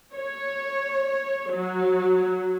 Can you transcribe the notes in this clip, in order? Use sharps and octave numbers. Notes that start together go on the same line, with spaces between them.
C#5
F#3